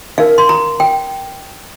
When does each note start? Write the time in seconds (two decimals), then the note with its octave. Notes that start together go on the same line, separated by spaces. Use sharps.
0.18 D#4 A#4 F5
0.38 C6
0.49 A#5
0.80 G5